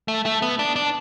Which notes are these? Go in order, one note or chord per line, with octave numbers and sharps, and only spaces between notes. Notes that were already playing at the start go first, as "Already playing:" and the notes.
A3
A3
B3
D4
D4